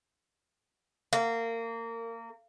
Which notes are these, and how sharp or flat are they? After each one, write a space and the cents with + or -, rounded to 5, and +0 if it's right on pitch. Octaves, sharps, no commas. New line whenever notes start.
A#3 -25